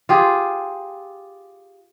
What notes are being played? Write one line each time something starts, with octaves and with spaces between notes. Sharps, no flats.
F4 G4 G#4